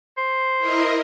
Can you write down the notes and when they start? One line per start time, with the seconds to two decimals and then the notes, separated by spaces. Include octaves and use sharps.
0.18 C5
0.59 E4 A#4 D#5